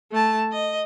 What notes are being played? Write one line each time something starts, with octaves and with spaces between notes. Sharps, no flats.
A3 A5
D#5